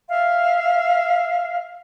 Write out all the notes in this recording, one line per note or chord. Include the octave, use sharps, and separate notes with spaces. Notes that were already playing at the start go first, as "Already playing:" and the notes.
E5 F5